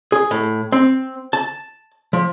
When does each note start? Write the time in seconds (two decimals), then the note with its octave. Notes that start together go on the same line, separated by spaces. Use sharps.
0.12 G#4
0.31 A2
0.72 C4
1.33 A5
2.13 F3